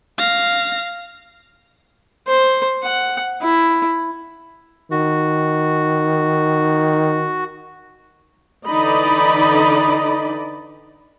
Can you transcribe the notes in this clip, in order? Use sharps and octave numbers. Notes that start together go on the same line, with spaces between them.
F5 A#6
C5
F#5
E4
D#3 F#4
D3 E3 D#4 D5 D#5 B5